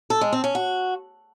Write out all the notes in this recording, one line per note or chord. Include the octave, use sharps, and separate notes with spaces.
A4
G#3
C4
C#4
F#4